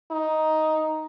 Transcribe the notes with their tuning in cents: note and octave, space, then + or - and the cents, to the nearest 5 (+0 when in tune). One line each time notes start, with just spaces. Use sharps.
D#4 +5